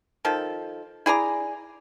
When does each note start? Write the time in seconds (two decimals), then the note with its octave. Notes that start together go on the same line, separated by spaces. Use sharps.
0.25 D#3 F3 A4
1.06 E4 G#4 D5 A#5